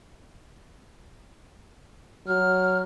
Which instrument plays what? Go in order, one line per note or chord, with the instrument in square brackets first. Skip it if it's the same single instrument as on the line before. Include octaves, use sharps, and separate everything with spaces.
[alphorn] F#3 [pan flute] F6